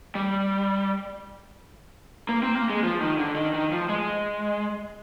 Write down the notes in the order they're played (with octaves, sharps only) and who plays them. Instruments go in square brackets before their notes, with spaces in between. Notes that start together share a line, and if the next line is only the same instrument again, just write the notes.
[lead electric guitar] G3
A#3
C4
A#3
G#3
F3
D#3
D3
D#3
D#3
F3
G#3